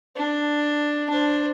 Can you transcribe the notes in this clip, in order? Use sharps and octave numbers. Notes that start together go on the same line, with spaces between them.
D4
D4 C5